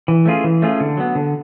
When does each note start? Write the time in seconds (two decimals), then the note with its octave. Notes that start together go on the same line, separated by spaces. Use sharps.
0.08 E3
0.26 A3 C#4 F4 G#4
0.44 E3
0.62 A3 C#4 F4 G#4
0.80 D3
0.97 F#3 B3
1.15 D3